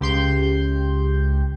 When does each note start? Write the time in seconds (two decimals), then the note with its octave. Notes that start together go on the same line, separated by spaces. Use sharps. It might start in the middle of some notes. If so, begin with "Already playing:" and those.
0.01 C#2 G4 C6 G6